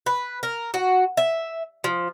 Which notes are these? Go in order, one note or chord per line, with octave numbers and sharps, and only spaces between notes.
B4
A#4
F#4
E5
F3